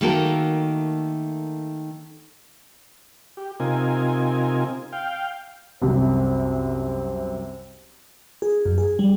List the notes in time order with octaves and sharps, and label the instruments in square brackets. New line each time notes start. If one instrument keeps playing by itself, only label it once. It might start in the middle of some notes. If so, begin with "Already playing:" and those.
[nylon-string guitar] D#3 A3 A#3 F#4 A4 A#4
[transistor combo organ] G4
C3 C4 D#4 F4 A#4 G#5
F5 G5
[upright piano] C2 F#2 C3 [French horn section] C5
[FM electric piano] G#4
F#2
G#4
G3